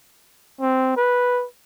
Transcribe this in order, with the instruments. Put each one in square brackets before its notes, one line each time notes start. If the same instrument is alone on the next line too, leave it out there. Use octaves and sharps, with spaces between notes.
[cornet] C4
B4